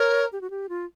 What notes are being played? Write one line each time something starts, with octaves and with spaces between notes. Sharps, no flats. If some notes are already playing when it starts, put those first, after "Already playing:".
Already playing: A#4 C#5
G4
F#4
G4
F4